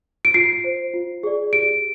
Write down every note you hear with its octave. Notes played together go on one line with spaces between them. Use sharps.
D7
F4 C7
C5
F4
G#4 D5
G4 D7